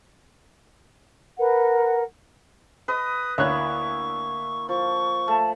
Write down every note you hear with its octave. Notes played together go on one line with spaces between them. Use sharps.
A#4 B4 F#5
B4 D#5 D#6
D2 A#3 E4 C#5 C#6 F#6
F3 C#6
A3 A5